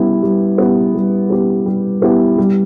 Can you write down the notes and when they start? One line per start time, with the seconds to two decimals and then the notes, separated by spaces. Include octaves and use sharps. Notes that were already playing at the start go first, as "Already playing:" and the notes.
Already playing: G3 B3 E4 G4
0.23 G3
0.58 B3 E4 G4
0.95 G3
1.30 B3 E4 G4
1.66 G3
2.02 B3 E4 G4
2.38 G3